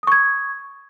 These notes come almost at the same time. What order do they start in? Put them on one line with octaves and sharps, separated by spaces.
D#6 C#6 G#6